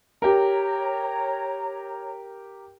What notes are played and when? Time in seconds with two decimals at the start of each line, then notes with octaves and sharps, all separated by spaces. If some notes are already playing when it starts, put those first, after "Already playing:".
0.22 G4 A#4 C#5 A#5